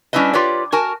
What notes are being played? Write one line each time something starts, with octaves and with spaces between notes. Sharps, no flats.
G3 C#4 D4 E4 B4 D#5
F4 G4 B4 C#5 D5
F#4 A#4 G#5 A5